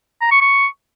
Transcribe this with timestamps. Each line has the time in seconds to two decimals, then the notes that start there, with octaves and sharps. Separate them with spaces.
0.21 A#5
0.31 C#6
0.41 C#6